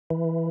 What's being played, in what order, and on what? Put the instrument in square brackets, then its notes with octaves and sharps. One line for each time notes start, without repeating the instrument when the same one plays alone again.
[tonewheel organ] E3